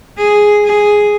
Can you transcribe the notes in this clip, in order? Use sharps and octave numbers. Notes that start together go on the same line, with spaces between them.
G#4
G#4